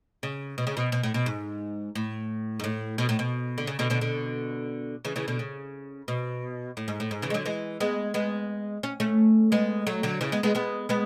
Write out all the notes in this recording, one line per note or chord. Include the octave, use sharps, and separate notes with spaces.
C#3
B2
C#3
B2
B2
A2
B2
G#2
A2
G#2
A2
B2
A2
B2
D3
C#3
B2 D3
B2 D3
B2 D3
C#3 E3
C#3 E3
B2 D3
C#3
B2
A2
G#2
A2
G#2
C#3 E3
G#3
D3 F#3
E3 G#3
G#3 B3
G#3 B3
C#4
A3 C#4
G#3 B3
F#3 A3
D3 F#3
C#3 E3
G#3 B3
G#3 B3
G#3 B3
G#3 B3